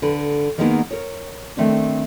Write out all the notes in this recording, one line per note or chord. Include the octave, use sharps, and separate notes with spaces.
D3 B4
D#3 G3 G#3 A#3 B3 D#4
A#4 C#5
D#3 A3 C4 D4